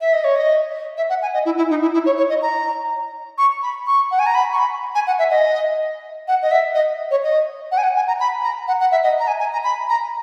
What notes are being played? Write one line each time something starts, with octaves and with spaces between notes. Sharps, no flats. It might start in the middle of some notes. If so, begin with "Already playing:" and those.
E5
D#5
C#5
D#5
E5
F#5
G#5
D#5
E4
E4
D#4
E4
E4
C#5
C#5
D#5
A#5
C#6
B5
C#6
F#5
G#5
A#5
B5
C#6
B5
G#5
F#5
E5
D#5
F#5
D#5
E5
D#5
C#5
D#5
F#5
G#5
F#5
G#5
A#5
B5
A#5
F#5
F#5
E5
D#5
A#5
G#5
G#5
A#5
B5
A#5